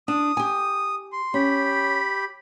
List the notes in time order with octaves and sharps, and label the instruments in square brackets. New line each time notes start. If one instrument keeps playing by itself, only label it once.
[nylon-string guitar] D4 [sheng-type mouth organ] D#6
[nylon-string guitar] G4 G#5
[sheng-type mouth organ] C6
[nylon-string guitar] C#4 [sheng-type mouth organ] G4 B5